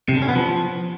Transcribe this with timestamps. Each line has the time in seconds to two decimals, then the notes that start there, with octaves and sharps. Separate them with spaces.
0.09 C3
0.15 D3
0.22 C#4
0.29 B3
0.35 F3